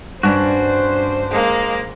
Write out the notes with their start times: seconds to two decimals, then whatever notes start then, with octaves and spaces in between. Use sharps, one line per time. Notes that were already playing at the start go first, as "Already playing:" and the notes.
0.23 G2 C#4 D4 F#4 C5
1.31 G#3 A#3